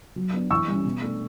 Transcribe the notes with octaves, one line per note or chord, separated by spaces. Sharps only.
F#3
B3 D4
E3 C#6 E6
G3 C#4
B2
A3 D4